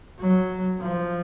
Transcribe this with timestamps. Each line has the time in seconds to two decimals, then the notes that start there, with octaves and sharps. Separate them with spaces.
0.19 F#3
0.80 F3